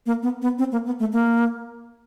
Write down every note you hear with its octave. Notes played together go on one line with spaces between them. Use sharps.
A#3
B3
B3
C4
A#3
B3
A3
A#3